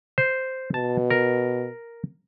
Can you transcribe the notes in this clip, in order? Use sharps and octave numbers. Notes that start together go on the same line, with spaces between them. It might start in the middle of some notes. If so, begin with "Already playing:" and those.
C5
B2 A5
A#4